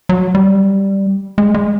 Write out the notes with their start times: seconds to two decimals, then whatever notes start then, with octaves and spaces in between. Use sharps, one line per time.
0.09 F#3
0.35 G3
1.38 G#3
1.54 G#3